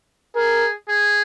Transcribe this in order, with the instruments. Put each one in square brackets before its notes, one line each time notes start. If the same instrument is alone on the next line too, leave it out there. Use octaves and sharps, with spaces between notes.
[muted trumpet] G#4 [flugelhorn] A#4
[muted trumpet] G#4